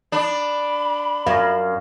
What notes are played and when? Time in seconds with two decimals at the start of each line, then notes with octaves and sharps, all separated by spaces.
0.12 D4 B5
1.27 F#2 F5